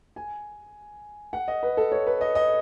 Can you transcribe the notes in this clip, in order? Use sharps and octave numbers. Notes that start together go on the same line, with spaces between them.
G#5
F#5
D#5
B4
A4
C#5
B4
D#5
D#5